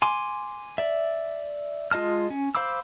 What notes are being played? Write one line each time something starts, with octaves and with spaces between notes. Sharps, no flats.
G#5 C6 D6
D5 E5
G#3 F4 D#5 A5 F6
C#4
C5 F5 B5 D6 E6